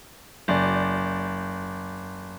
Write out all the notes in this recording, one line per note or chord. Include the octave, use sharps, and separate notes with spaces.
F#1 D5